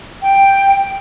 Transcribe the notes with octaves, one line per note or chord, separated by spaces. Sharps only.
G5